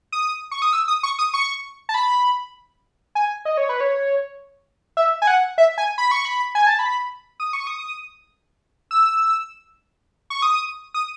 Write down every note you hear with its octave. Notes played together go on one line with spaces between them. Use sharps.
D#6
C#6
D#6
E6
D#6
C#6
D#6
C#6
A5
B5
G#5
D#5
C#5
B4
C#5
E5
G#5
F#5
E5
G#5
B5
C#6
B5
G#5
A5
B5
D#6
C#6
D#6
E6
C#6
D#6
D#6